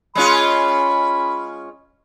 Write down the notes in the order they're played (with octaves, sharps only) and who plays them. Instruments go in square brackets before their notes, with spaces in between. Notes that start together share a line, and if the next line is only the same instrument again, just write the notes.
[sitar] G#3 C#4 F4 [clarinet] B5